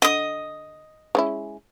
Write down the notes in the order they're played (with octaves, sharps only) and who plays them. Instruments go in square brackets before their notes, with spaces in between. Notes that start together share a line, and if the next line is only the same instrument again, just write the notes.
[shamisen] D3 [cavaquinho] D#5 D#6
[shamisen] G#3 C#4 E4